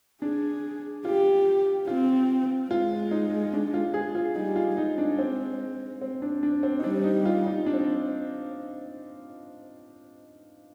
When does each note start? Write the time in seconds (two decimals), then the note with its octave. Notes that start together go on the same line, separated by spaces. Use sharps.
0.22 D4 G#4
1.05 F4 G4
1.88 C4 F4
2.70 G#3 F4
3.11 D#4
3.53 D4
3.74 F4
3.94 G#4
4.15 F4
4.35 G3 D#4
4.56 F4
4.77 G#3 D#4
4.98 D4
5.19 C4
6.01 C4
6.22 D4
6.43 D4
6.63 C4
6.79 D#4
6.84 G3 D4
7.04 D#4
7.25 F4
7.46 D#4
7.66 D4
7.74 C4